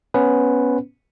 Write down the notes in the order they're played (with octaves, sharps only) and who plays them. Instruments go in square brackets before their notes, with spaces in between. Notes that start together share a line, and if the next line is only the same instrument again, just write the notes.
[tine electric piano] B3 C#4 B4